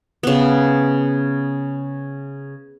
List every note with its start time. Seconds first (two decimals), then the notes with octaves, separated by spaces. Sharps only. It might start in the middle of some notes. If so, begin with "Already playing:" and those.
0.23 C#3 B3